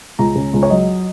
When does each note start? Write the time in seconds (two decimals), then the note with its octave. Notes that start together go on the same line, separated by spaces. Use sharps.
0.19 C#2 A#5
0.36 C#3
0.53 C#2
0.63 C#5
0.70 F#3 D#5